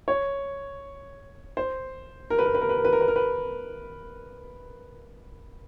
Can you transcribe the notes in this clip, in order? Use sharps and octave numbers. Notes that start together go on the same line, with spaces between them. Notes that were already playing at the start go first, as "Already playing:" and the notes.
C#5
C5
A#4
B4
A#4
B4
A#4
B4
A#4
B4
A#4
B4
A#4
B4